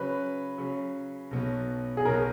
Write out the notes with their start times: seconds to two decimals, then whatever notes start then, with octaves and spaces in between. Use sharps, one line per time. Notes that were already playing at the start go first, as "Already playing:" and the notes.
Already playing: C#3 F#3 C#4 B4
0.58 C#3 F#3 C#4
1.31 B1 B2 F#3 B3
1.97 G#4
2.05 B1 B2 F#3 B3 A#4